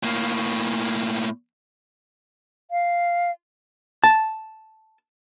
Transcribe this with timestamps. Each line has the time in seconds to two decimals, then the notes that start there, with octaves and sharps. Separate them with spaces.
0.03 A2 A#3
2.71 F5
4.04 A5